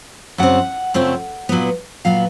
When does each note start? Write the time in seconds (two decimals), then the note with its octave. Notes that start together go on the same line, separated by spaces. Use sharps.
0.38 F#2 C#3 C4 F#5
0.94 F#2 C#3 F3 A3 C4
1.49 A#2 F#3 B3
2.05 A#2 F#3 B3 F5